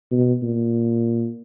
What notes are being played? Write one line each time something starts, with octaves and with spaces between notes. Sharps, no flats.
B2
A#2